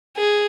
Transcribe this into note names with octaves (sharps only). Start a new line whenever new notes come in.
G#4